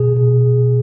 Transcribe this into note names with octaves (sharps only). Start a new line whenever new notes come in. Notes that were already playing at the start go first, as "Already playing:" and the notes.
Already playing: B2 G#4
B2